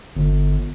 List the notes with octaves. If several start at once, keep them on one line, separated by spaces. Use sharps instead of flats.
G1